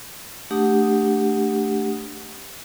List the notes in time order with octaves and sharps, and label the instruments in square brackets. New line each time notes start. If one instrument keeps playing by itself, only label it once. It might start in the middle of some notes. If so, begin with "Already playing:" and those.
[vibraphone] A3 D4 G4 F#5 D#6